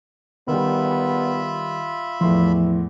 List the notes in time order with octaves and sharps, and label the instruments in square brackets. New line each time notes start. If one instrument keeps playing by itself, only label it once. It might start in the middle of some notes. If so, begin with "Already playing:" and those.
[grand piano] D#3 G3 [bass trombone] B3 [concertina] F4 E5 B5
[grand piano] E2 A2 C6 [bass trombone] E3 [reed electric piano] F3